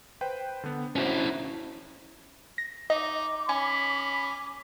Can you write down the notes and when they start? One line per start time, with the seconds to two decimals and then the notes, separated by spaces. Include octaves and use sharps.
0.21 B4 C5 G5
0.63 D3 B3
0.96 C#4 D4 E4 F#4 C5
2.58 A#6
2.90 D#4 D#5 D6
3.49 C#4 G#5 B5